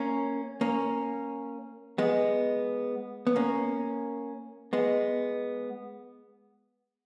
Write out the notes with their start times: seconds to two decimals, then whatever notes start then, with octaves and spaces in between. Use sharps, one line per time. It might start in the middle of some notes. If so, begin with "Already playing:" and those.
Already playing: A#3 C#4
0.61 A#3 C#4
1.98 G#3 B3
3.27 B3
3.36 A#3 C#4
4.73 G#3 B3